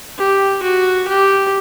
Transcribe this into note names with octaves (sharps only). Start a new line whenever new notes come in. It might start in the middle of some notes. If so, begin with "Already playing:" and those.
G4
F#4
G4